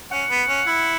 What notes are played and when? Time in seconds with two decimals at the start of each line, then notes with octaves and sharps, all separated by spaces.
0.11 C#4 F#5
0.30 B3
0.48 C#4
0.67 E4